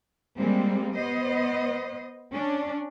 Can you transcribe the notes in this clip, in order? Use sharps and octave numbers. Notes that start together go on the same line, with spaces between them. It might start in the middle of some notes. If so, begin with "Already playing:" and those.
G3 G#3 A#3 C4
B3 C5 D#5
C#4 D4